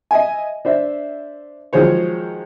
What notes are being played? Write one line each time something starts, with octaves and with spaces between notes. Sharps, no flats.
D#5 E5 G#5
D4 C5 E5
D#3 F3 F#3 G#3 C5 C#5